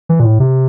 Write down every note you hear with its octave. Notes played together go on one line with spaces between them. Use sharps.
E3
A#2
A2
C3